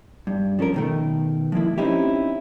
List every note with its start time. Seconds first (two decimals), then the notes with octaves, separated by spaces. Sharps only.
0.27 G2
0.59 F3 C#4 A4 A#4
0.74 B2 D#3 A3
1.52 F3 G#3 A#3 E4
1.78 C4 C#4 D#4 E4 G4